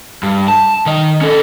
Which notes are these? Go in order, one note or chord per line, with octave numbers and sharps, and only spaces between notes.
G2
A5
D#3 D#5
C#4 A4